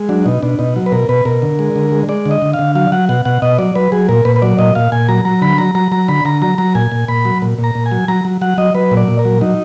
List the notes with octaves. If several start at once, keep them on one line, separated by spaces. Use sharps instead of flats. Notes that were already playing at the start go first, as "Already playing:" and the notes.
Already playing: G#3
F#3 D4
B2 D#4
B2 D4
B2 D#4
F#3
B4
B2 A#4
B2 B4
B2 A#4
D3
G#3
D3
G#3
G#3 D5
D3
D#5
D3
F5
D3
F#3 F5
F#3 F#5
B2 F#5
B2 F#5
B2 D#5
F#3 D5
F#3 B4
F#3 G#4
A#2 A#4
A#2 B4
B4
F#3 D5
A#2 D#5
A#2 F5
A#2 G#5
F#3 A#5
F#3 A#5
D3 B5
F#3 A#5
F#3 A#5
F#3 A#5
D3 B5
D3 A#5
F#3 A#5
F#3 A#5
A#2 G#5
A#2
A#2 B5
F#3
A#2
A#2
A#5
A#2
G#5
F#3
F#3 A#5
F#3
F#3 F#5
F#3 D#5
F#3 B4
A#2
D5
A#2
A#4
F#3
F#3 D#4